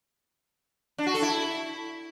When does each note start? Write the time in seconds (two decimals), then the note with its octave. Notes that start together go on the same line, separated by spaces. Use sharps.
0.98 D4
1.06 F#4
1.14 A4
1.22 E4